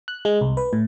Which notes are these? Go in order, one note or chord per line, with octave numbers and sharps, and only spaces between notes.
F#6
G#3
C2
B4
A2